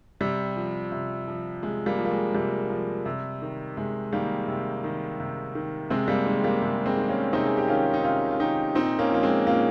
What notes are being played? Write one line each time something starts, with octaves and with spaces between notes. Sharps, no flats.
C3 G3
F3
C3
F3
C3 G#3
G3 A#3
F3
A#3
G#3
C3 G3
F3
C3
D#3
C3 G#3
D#3 G3 A#3
C3
D#3
C3
D#3
C3 G#3 C4
G3 A#3
D#3 G#3
G3 A#3
C3 G#3
G#3 C4
D#3
A#3 C#4
C3 C4 D#4
G#4
G4
D#3 C#4 F4
D#4
C3 C#4 F4
F4
D#3 D#4 G4
A#2 C4 D#4
A#3 C#4
F3 A#3
G#3 C4
A#2 A#3 C#4